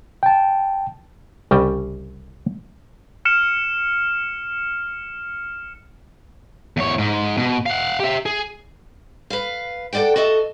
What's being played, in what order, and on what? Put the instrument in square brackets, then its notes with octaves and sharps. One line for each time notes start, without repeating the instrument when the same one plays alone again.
[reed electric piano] G5 A5
[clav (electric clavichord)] C2 C#3 G3 D#5 E5 G5
[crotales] F6 C#7 E7
[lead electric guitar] E2 C#5
G#2
B2
F5 F#5
G4 E5
G#4
[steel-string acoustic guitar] B4 F5
A4 B4 D5 F#5 G5
F#4 A4 D#5 E5